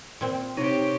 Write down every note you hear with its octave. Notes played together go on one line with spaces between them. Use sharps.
A#2 C4
C3 D#4 G4 C#5